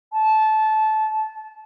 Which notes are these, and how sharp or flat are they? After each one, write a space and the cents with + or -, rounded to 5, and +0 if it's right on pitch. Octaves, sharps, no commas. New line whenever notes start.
A5 -20